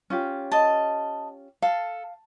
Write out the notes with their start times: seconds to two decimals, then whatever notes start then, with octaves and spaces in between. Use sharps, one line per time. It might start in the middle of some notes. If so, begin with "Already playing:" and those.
0.10 C#4 F4 G4
0.52 D#5 A5
1.62 A4 F5